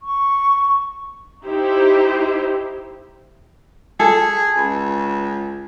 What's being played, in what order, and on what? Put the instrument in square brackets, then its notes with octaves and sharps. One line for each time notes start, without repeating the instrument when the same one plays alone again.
[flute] C#6
[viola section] D#4 E4 G4 C5
[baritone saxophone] G#4 [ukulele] A4
[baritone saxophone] C#2